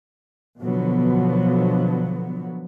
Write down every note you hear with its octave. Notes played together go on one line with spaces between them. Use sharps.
B2 D3 F3 F#3 B3